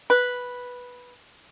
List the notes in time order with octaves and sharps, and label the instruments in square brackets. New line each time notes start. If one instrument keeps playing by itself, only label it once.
[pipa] B4